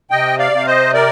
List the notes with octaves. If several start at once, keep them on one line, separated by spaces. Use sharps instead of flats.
C3 D#5 G5
D5 F5
C3 F5
C5 D#5
A#4 D5